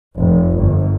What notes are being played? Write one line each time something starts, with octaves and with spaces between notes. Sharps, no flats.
F1
G1